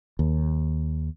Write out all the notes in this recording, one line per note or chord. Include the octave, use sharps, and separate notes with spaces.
D#2